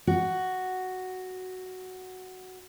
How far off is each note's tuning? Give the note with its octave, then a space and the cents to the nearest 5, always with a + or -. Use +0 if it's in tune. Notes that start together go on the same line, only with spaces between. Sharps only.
F#4 +5